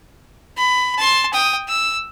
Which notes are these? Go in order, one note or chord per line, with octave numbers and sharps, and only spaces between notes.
B5
A5 C6
G5 D#6
E6